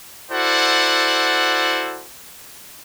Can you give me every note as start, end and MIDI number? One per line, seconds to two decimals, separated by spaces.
0.31 2.05 64
0.31 2.05 66
0.31 2.05 69
0.31 2.05 72
0.31 2.05 74
0.31 2.05 78